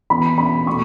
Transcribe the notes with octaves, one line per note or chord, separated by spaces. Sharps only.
E3 B3 B5
B5
B2 A3 C#6